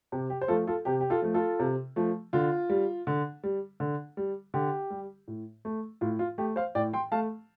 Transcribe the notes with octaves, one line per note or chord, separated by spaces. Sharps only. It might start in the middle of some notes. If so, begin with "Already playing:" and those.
C3 G4
G4
C5
F3 A3 F4 A4
F4 A4
C3 G4
G4
F4 A4
F3 A3
F4 A4
C3
F3 A3
D3 F4
G3
D3
G3
D3
G3
D3 G4
G3
A2
A3
A2 F4
F4
A3 G4
C5 F5
A2 D5 G5
G5 C6
A3 F5 A5